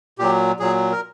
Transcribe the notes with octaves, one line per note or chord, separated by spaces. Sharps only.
A#2 F#3 G4
A#2 F#3 G#4
A#4